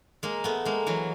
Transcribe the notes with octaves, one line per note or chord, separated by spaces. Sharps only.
G#3 A#3
A3 B3
G#3 A#3
E3 F#3